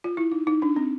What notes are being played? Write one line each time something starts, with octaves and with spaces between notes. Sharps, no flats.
F4
E4
D#4
D#4
D4
C4